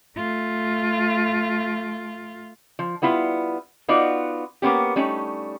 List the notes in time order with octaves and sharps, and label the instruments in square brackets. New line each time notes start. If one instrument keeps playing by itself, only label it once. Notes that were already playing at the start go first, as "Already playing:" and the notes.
[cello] A3 F4
[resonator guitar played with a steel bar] F3
G3 B3 E4 F4
B3 D#4 F4 F#4 D5
A#3 B3 C#4 G4
G3 A3 C#4 D#4